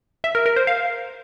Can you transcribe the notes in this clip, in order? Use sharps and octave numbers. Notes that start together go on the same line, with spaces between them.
E5
A#4
A#4
C5
F5